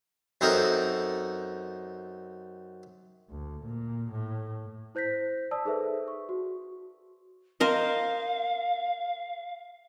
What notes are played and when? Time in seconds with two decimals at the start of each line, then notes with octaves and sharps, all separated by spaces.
0.41 F#2 C4 D#4 A4 A#4
3.30 D2
3.64 A#2
4.11 A2
4.95 E4 C5 G6 A#6 B6
5.51 D5 A5 D#6 E6
5.65 D#4 G#4 A4 B4 C5 E5
6.08 C#6
6.29 F#4
7.60 A#4 C5 D#5 F5